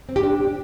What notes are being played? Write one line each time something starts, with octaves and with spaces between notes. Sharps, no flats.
C4
G4
D4